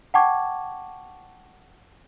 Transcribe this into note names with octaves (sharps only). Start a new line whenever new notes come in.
F#5 G5 A5 C#6 D6 G#6